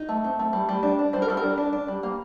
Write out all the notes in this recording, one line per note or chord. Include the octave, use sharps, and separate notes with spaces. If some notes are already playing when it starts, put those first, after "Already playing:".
Already playing: D#4
A3
C4
A3
G3
G3
D4
D4
G3 C5
A#4
G3 A4
A#4
D4
D4
D4
G3
A#3